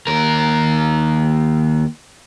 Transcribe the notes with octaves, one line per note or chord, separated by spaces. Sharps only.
D#2 A#4